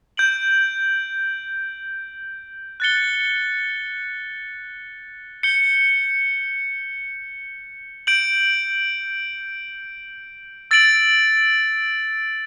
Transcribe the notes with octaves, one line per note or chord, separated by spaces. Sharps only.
G6 D7 F#7
F#6 A6 C#7 G7
G6 C#7 G7
G6 D7 F#7
E6 A6 D7 F#7